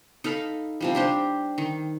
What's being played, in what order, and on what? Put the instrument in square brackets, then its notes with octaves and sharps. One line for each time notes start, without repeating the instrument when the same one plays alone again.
[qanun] D#4 A4 F5 B5
C3 F3 G3
D4 G4 C5
D#3